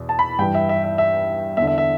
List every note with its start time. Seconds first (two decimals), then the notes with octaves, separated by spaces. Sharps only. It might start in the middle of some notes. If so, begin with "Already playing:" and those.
Already playing: E2 B2
0.09 A5
0.19 B5
0.39 G2 E3 G5
0.54 E5
0.69 E5
0.84 E5
0.98 E5
1.57 E2 E5
1.62 D3
1.67 E5
1.78 E5